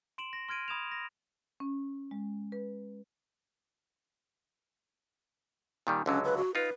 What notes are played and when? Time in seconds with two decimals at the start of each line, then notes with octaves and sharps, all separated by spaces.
0.18 C6 D7 E7 F#7
0.33 A#6
0.49 C6 F6 G#6 D7 D#7
0.68 B5 D#6 G#6 E7 F7
0.92 A#6
1.60 C#4
2.11 G#3
2.52 B4
5.87 A#2 D#3 G3
6.06 C#2 D3 F#3 C#4
6.24 B4
6.37 F#4
6.55 D#4 F4 B4